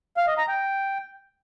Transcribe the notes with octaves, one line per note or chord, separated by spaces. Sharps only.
F5
D#5
A#5
G5